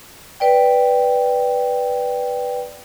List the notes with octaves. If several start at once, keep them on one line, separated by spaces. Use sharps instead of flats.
B4 D5 G5